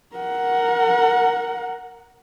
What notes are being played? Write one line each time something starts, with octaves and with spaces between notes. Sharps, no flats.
A#4 F#5